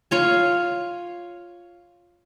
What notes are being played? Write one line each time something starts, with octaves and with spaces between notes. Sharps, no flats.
F4 C#5 G#5